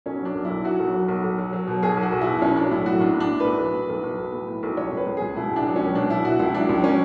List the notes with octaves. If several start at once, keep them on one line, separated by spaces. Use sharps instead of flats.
B1 C#4
F#3 D4
B1
E4
B1
F#3 F#4
B1
F#3
B1
B1
F#3
F#3
B2
B1 G#4
B1
F#4
B1
E4
B2
B1 C#4
F#3 D4
A2 E4
A2 F#4
B1 D4
A2
D4
A2
B1 B4
B1
A2
B1
B1
B1
A2
A2
B1
C#2 C#5
C#2 B4
C#2
C#2 G#4
B2 E4
C#2
D4
F#3
C#4
C#2
B2 D4
B2 E4
B2 F#4
C#2 E4
F#3 D4
C#2
F#3 C#4